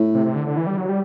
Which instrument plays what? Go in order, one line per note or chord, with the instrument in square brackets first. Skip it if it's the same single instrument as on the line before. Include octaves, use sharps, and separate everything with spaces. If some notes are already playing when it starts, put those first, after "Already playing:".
Already playing: [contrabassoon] A2
[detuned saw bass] C3
C3
D3
D3
E3
G3
F#3
G3